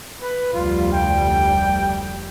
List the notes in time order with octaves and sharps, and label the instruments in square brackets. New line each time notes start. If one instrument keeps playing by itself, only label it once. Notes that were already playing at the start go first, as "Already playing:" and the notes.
[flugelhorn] B4
[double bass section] F1 D2 G3 [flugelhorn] F4
[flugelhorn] G5